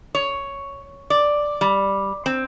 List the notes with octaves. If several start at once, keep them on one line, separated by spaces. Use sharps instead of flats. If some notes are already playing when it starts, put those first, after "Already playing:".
C#5
D5
G3
C4